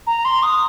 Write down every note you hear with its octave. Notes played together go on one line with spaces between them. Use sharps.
A#5
C6
D#6